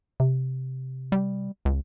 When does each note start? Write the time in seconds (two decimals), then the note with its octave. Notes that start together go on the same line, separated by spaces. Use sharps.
0.20 C3
1.12 G3
1.65 C#2